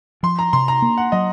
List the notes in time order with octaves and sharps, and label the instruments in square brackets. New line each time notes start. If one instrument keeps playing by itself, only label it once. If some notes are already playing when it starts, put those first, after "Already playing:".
[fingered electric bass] F3 [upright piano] C6
[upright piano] A#5
[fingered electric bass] C3 [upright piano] C6
[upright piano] A#5
[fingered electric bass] A#3
[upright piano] F#5
[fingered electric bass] F#3 [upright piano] D#5